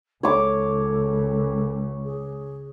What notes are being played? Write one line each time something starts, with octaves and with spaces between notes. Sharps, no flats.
C#2 A4 C#5 D6
G#4